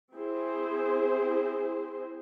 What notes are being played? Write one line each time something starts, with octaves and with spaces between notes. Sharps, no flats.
C4 E4 G#4 C5